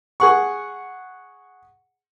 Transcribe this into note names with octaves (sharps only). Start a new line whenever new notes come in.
G#4 F#5 C#6